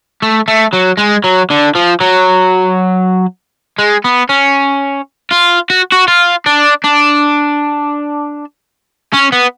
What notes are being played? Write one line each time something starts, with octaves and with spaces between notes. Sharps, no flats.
A3
A3
F#3
G#3
F#3
D3
F3
F#3
G#3
B3
C#4
F4
F#4
F#4
F4
D4
D4
C#4
B3